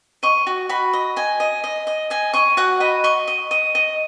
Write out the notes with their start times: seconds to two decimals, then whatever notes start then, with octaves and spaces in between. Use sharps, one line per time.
0.23 D#5 C#6
0.47 F#4
0.69 F#4 B5
0.93 D#5
1.16 D#5 G#5
1.40 D#5
1.64 D#5
1.87 D#5
2.10 D#5 G#5
2.33 D#5 C#6
2.57 F#4 F#5
2.80 D#5 B5
3.04 D#5 C#6
3.28 D#5
3.51 D#5
3.75 D#5